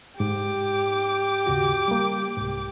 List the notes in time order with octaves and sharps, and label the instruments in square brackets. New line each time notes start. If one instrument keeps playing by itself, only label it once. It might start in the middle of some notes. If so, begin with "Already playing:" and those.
[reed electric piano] G#2 [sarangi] G4 [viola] D6
[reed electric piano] D#2 C#3 F#4
G3 A#3
C2 G#2